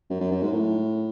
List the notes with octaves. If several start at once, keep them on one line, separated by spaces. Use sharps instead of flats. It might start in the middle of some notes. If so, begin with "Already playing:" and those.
F#2
F#2
F#2
G#2
A2